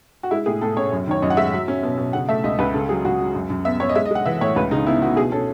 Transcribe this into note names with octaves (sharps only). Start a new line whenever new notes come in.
F#4
G#3 E4
A2 G#4
A2 A4
C#4 C#5
F#2
D#3 C#5
F#2 D#5
F#5
G#3 E5
F#3
C#4
B2
B2
C#3 F#5
A3 E5
C#2 D#5
C#2 B4
C#3 A4
F#3 G#4
C#2 F#4
F#3
F#2
F#2
B3 E5
B3 C#5
D#5
G#3 E5
D#5
G#3 F#5
E3 E5
A2 C#5
C#2 B4
C#3 D#4
B3 E4
B3 F#4
B2 G#4
C#4 A4